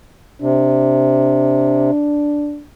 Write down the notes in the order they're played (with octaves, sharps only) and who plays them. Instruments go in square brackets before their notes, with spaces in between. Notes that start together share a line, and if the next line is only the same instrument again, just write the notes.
[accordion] C3 [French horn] D4